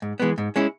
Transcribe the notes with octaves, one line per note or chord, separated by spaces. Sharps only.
G#2
E3 G#3 B3
G#2
G#3 C#4 E4